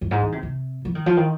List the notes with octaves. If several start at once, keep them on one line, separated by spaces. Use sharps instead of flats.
F#2
G#2
D#3
C3
C3
F3
D#3
F3
D#3